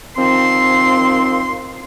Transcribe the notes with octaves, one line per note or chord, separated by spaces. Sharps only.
D#3 F3 C4 C6